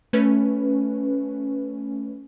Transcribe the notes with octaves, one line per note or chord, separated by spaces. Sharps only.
A3 C#4 B4